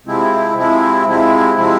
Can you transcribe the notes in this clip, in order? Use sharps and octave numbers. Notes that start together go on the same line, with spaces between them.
C3 F3 G#3 C4 E4
C3 F3 G#3 C4 E4
C3 F3 G#3 C4 E4
C3 F3 G#3 C4 E4